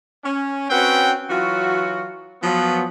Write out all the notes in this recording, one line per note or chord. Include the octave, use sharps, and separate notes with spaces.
C#4
C4 C#4 F#4 B4 F#5 G5
E3 F#3 F4 F#4
F3 F#3 B3